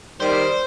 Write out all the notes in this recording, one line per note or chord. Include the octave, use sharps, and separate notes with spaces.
D#3 G3 C5